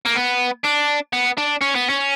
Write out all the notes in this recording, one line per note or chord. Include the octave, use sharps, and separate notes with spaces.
A#3
B3
D4
B3
D4
C#4
B3
C#4